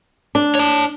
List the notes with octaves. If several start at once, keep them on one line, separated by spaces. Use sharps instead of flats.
D4
C#5 A5